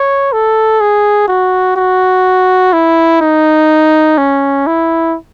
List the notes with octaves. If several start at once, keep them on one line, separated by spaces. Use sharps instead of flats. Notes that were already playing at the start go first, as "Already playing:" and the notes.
Already playing: C#5
A4
G#4
F#4
F#4
E4
D#4
C#4
E4